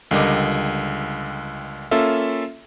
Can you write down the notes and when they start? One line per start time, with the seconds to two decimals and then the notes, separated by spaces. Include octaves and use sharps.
0.11 C#2 D3 G3 A#4 D#5 D6
1.91 A#3 C#4 F4 A4 E5